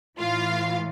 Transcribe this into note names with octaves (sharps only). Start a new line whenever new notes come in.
A2 E3 F4 F5